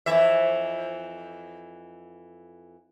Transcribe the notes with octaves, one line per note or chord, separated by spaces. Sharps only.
F2 E3 E5